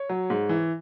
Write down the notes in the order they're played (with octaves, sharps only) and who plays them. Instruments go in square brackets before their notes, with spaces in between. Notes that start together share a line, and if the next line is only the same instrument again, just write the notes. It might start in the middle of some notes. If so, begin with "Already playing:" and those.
Already playing: [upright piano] C#5
F#3
G#2
E3